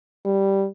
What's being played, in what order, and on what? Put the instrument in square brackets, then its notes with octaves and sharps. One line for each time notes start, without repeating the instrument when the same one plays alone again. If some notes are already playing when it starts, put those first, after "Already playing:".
[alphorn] G3